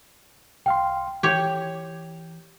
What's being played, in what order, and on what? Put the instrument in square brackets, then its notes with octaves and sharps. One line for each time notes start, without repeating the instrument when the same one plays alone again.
[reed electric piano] C2 F5 C6 [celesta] G5
[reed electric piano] E3 [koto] G4 C#5